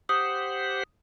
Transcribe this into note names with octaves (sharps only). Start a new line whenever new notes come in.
G4 C5 F#5 D#6